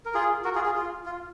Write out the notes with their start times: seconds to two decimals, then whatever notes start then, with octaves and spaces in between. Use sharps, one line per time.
0.06 A#4
0.14 F4 G#4
0.45 F#4 A#4
0.55 F4 G#4
0.66 F4 G#4
0.76 F4
1.06 F4